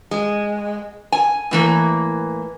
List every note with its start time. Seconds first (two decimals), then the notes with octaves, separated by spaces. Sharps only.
0.11 G#3
1.12 G#5
1.51 A2 E3 A#3